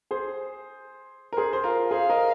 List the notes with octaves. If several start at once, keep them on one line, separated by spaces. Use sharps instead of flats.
G#4 C5
A#4
G#4 C5
C5
F4 A#4
G#4 C5 F5
A#4 D#5